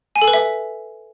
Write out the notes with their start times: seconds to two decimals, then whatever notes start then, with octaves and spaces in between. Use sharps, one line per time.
0.16 G#5
0.22 A4
0.28 B4
0.33 E5